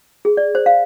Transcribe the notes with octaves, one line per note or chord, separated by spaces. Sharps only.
G#4
D5
C5
F5